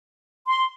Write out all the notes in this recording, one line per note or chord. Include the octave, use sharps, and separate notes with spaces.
C6